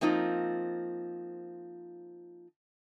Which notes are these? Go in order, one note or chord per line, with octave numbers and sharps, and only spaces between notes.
F3 A#3 C4 D#4 F4